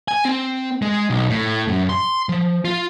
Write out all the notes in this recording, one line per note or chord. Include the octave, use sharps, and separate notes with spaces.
G#5
C4
G#3
B1
A2
F#2
C6
F3
F4